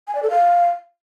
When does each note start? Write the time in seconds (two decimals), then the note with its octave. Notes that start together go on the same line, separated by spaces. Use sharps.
0.08 G#5
0.15 D5
0.23 A4
0.30 F5